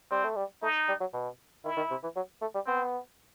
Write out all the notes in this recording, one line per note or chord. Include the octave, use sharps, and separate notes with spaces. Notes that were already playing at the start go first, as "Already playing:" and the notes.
G3 C4
A3
G3
A3 D#4
G3
F#3
B2
D#3 E4
D#3
C3
E3
F#3
A3
G3
B3 C4